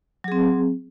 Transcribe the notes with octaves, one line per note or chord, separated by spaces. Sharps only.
F#3 C4 G#4